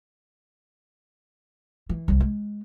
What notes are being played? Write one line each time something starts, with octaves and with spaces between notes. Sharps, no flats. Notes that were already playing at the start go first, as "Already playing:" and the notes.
E3
C2 G3
G#3